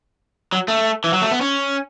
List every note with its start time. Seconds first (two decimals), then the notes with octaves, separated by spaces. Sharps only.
0.53 F#3
0.68 A3
1.04 E3
1.13 F#3
1.22 A3
1.31 B3
1.41 C#4